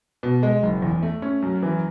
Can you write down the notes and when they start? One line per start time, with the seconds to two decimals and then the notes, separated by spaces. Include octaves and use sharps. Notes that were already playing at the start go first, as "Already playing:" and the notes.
0.23 B2
0.43 G#3
0.63 F#1
0.82 E2
1.02 A3
1.22 C#4
1.42 F#2
1.63 E3